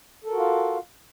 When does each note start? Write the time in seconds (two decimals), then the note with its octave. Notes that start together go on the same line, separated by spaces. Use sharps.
0.24 A4
0.28 A#4
0.32 F#4
0.36 F4
0.40 F5